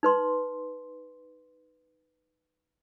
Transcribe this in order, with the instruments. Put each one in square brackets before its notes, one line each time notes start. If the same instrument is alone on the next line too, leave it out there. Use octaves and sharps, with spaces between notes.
[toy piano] D#4 B4 C6